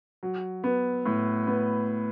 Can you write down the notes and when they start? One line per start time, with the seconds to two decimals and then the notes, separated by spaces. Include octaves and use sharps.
0.23 F#3
0.64 B3
1.06 A2
1.47 B3